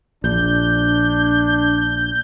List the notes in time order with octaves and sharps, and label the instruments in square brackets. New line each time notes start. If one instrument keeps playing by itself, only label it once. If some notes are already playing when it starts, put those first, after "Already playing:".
[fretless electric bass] A#1 [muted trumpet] D4 [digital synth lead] G6